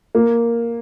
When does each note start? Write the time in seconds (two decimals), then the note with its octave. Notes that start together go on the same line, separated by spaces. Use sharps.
0.15 A#3